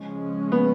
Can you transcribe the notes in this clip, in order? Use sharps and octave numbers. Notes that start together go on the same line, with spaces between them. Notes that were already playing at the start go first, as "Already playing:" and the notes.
Already playing: C#3 F3 G#3 C#4
B3